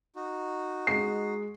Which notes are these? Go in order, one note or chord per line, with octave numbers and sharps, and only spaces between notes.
D#4 F#4
G#3 C7